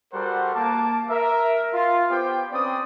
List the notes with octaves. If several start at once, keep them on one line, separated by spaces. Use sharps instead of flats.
G3 F#4 A4 A#4 C5 F#5
A#3 A5 D6
A#4 E5
F4
B3 G4 C5 G5
C4 C#4 B4 D5 G5 D#6